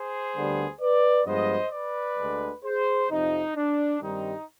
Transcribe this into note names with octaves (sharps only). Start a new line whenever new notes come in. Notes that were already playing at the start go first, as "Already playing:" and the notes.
Already playing: G#4 C5
D2 D3 G3 B3
B4 D5
G2 F3 G#3 B3 C5 D#5
B4 D5
D2 D3 G#3
G#4 C5
F2 C3 F3 D#4
D4
G2 D#3 G3 C4 D#4